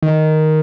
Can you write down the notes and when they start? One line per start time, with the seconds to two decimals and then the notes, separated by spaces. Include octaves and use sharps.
0.02 D#3